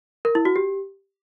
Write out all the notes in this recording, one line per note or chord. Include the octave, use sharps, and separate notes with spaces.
A#4
E4
F#4
G4